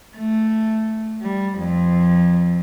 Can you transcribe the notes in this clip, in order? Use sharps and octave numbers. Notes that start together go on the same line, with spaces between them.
A3
G3
F2